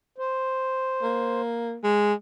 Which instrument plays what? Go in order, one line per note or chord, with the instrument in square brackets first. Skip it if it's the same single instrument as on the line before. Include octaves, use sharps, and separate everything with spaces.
[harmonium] C5
[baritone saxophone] A#3
G#3